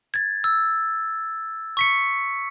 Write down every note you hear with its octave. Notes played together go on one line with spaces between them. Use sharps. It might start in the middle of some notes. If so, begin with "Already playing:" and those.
G#6 A6
E6
C#6 B6 C#7